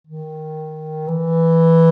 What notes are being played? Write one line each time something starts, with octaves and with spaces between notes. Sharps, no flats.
D#3
E3